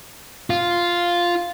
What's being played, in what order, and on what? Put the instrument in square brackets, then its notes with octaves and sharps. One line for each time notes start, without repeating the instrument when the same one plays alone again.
[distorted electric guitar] F4